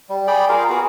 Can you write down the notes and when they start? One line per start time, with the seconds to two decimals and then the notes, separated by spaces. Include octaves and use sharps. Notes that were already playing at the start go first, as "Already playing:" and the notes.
0.09 G3
0.27 G#4 D5 G5 B5
0.49 F4 G#4 A#4 F5
0.69 B3 F#4 G#4